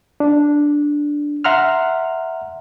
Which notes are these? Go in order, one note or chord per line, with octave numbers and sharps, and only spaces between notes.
D4
E5 F#5 A#5 C6 F6